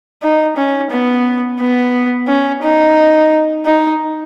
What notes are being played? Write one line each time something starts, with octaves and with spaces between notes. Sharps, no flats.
D#4
C#4
B3
B3
C#4
D#4
D#4